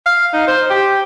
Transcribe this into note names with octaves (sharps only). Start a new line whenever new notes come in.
F5
D#4
C5
G4